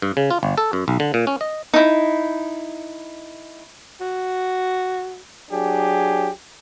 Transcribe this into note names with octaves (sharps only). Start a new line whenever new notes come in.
G2
C#3
F4
G1
A4
F#2
B1
D3
A#2
C#4
D#5
D#4 E4
F#4
F#3 D4 G4 G#4